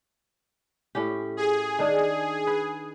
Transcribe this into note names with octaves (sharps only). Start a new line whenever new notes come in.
A2 C#4 G4
G#4
D#3 D4
B4